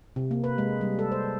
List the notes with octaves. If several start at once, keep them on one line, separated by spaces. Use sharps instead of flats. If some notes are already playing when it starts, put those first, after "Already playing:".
C3
A#3
B4
G#3
G3
A4
C5